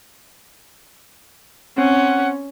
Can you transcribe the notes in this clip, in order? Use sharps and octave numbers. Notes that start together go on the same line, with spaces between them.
C4 C#4 F#5